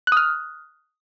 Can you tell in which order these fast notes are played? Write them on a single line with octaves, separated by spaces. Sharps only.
F#6 D#6 F6